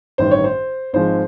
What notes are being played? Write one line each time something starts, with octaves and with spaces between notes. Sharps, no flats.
A1 G2 D#3 C5
C#5
C5
G#1 G#2 F3 G#3 C5